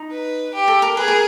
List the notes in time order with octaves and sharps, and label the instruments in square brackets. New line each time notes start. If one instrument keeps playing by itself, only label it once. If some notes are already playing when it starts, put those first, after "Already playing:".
Already playing: [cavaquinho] D#4
[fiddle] B4
G4
[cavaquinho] A4
A#4
[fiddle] G#4 [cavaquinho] B4
[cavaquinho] A#4